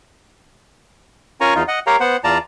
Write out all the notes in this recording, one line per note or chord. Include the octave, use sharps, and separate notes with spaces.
C#4 F4 A#4 G#5 A#5 C#6
E2 D#4 F4
D#5 F#5
G4 A#4 C#5 F5 G5 A#5
B3 C5 F#5
E2 F4 D5 A5 A#5